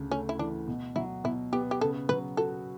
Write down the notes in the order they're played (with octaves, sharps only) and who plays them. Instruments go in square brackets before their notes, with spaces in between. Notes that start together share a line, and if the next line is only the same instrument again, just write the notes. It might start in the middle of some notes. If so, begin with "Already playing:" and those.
Already playing: [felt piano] D2 C#3
[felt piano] A3 [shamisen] C#4
[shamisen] E4
[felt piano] E3 [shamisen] D4
[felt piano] B2
[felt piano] F#3 [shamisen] E4
[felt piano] B2 [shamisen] E4
[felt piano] B3 [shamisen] G4
[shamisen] G4
[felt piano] C#3 [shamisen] A4
[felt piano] F#3 [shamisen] B4
[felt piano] F#4 [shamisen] A4